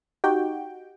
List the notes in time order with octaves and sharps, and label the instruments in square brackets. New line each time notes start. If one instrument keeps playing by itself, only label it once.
[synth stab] D#4 F#4 G4 G5